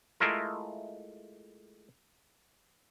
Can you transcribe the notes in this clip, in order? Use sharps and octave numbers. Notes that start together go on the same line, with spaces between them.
G#3 A3 E4 F4 A#4